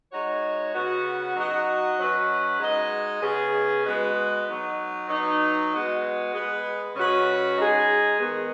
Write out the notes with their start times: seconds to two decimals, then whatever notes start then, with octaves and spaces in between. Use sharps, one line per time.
0.11 G#3 D#4 F#4 C#5
0.73 C#3 B3 F#4
1.35 F#3 D#4 F#4 D#5
1.98 F#3 C#4 B4 D#5
2.60 G#3 D#4 F#4 D#5
3.22 C#3 B3 G#4
3.83 G#3 B3 F#4 B4 D#5
4.46 F#3 B3 D#4
5.09 F#3 B3 D#4
5.70 G#3 B3 F#4
6.33 G#3 B3 G#4 B4
6.94 C#3 G#3 C#4 F#4 B4
7.57 G#3 D#4 G#4
8.19 D#3 G#3 B3